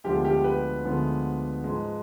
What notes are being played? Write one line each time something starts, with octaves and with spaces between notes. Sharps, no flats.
D2 D3 F3 G#3 B3 G4
G4
B4
D2 D3 F3 G#3 B3
G#2 F3 G#3